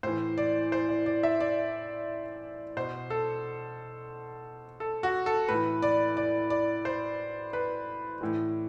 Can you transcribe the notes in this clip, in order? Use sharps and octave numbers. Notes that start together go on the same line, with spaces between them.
A2 E3 C5
D5
C5
D5
D5
E5
D5
B2 C5
A4
A4
F#4
A4
A2 E3 B4
D5
D5
D5
C5
B4
A2 E3